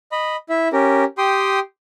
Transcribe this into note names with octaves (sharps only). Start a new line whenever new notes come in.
D#5 B5
E4 E5
C#4 G4 A#4
G4 G5 C6 D#6